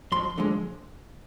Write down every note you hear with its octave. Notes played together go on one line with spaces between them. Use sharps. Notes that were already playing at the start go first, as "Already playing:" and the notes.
F2 C6
D3 F3 G#3